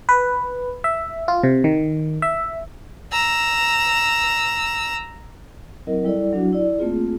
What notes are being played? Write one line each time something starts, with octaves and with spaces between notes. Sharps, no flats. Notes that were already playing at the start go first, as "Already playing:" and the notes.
B4
E5
F4
C3
D#3
E5
A#5 E6
F#3 C4 E4 A#4 D#5
G3 E4 A4 D5
F#3 D4 E4 F#4
E4 D5
A3 A#3 C4 F4 G#4